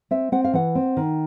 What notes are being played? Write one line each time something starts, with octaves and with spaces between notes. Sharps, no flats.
C4 E5
C4 F#5
F5
E3 F#5
C4
D#3